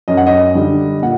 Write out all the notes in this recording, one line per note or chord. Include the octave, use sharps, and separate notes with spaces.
F#2 D#5
F#5
D#5
D3 G3
A#2 F#5